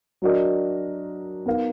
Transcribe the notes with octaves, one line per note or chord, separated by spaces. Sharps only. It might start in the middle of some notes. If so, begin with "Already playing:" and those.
F#3 D4 F#4 A#4 D#5
B3 D#4 A#4 F5